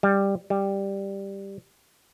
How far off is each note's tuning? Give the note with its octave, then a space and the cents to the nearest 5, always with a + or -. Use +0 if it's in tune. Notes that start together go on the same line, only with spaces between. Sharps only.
G3 +10
G3 +5